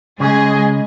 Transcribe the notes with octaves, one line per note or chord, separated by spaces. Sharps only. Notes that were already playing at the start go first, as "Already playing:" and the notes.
C#3 G#3 G#4 D#5